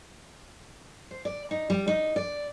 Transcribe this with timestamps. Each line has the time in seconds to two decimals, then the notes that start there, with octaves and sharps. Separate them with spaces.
1.11 C5
1.25 D5
1.51 D#4
1.70 G3
1.88 D#4
2.16 D5